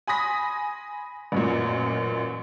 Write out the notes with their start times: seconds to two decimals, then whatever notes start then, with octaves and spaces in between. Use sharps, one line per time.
0.07 G#5 B5 C6 D#6 A#6 B6
1.32 A1 F#2 A#2